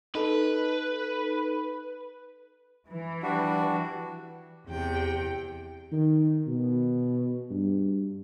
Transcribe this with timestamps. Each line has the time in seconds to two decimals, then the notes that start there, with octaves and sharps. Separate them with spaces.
0.15 D#4 A4 B4
2.92 E3
3.23 G3 D4 F#4
4.68 E2 C3 G5
5.92 D#3
6.47 B2
7.51 G2